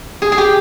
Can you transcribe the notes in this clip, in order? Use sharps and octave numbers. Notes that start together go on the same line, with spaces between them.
G#4
G#4
G4